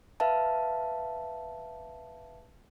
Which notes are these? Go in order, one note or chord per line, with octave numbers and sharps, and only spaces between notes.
B4 E5 F5 A5